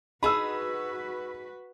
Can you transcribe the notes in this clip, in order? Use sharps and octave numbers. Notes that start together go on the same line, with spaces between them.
D#4 F#4 G#4 B4 B5 E6